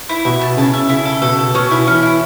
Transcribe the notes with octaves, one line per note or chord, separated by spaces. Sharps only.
E4
B2 E5
A5
C#3 A5
E5
C#3 E4
A4
B2 A4
A4
B2 C#4
E4
E3 C#4
E4